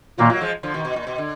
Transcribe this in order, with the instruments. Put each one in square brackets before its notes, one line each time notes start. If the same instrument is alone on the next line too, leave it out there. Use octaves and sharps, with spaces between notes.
[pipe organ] A#2 A#3 [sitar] D#3 F#3
[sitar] F#3 A#3
F3 G#3
D3 F3
B2 D#3
B2
A#2
B2
D3